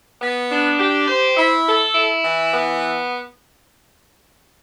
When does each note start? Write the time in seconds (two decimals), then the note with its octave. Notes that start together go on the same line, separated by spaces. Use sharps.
0.21 B3
0.50 D4
0.79 G4
1.08 C5
1.37 E4
1.66 A4
1.95 E4
2.24 E3
2.53 B3